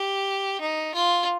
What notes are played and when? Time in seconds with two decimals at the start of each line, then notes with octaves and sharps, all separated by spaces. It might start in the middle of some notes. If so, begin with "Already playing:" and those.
Already playing: G4
0.61 D#4
0.95 F4